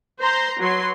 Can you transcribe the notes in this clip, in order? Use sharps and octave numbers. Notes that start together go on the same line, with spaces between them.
C5 A#5 C6
F#3 B4 C6